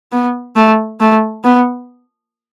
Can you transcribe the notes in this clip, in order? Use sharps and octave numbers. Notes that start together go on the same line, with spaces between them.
B3
A3
A3
B3